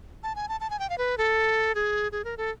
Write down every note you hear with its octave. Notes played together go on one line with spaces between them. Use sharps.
A5
G#5
A5
A5
G#5
G5
F5
B4
A4
G#4
G#4
A#4
A4